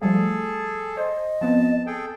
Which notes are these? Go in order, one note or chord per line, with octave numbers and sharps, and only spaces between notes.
F3 G3 A3 G#4 A4
C5 D#5
F3 B3 C4 A5
G#4 A4 G5